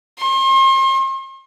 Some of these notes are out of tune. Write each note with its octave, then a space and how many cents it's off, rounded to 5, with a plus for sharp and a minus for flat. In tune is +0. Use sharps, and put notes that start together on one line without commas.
C6 +40